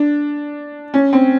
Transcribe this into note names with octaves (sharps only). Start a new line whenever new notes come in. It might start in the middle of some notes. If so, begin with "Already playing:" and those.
Already playing: D4
C#4
C4